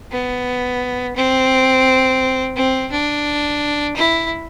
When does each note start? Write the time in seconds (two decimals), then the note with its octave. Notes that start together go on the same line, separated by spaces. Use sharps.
0.11 B3
1.16 C4
2.56 C4
2.91 D4
3.96 E4